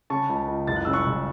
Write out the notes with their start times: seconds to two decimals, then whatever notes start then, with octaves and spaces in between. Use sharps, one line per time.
0.10 C#3 A5 C#6
0.29 C#2
0.48 C#2
0.67 F#1 A6
0.76 F#6
0.85 C#3 E6
0.93 C#6 F#6
1.07 F#1